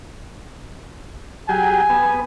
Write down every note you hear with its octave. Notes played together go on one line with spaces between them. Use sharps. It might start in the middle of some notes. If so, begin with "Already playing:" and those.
F#3 G4 G#4 G#5
B3